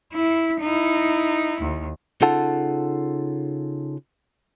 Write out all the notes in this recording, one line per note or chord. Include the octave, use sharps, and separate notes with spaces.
E4
D#4 E4
D#2
C#3 D#4 F4 A4 F#5 A5